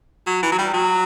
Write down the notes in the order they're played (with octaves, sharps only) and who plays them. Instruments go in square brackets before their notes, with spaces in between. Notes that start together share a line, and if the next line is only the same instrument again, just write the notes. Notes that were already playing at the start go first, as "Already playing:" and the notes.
[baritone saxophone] F#3
E3
F#3
G3
F#3